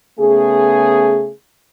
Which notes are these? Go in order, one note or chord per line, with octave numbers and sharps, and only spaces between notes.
C#3 A3 B3 G#4